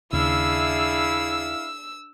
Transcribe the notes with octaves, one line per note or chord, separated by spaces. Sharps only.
D#2 C#3 D4 E4 G#4 F5 E6